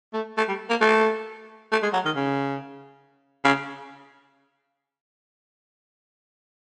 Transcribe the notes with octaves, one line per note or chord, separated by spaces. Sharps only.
A3
A3
G3
A#3
A3
A3
G#3
F#3
D#3
C#3
C#3